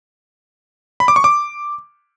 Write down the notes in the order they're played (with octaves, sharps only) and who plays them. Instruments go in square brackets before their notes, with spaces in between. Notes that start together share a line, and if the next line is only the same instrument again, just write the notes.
[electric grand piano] B5
D6
C#6
D6